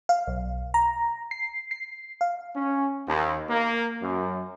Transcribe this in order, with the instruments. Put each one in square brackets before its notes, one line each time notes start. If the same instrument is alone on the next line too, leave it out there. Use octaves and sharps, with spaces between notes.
[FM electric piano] F5
B1
A#5
C7
C7
F5
[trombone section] C#4
D#2
A#3
F#2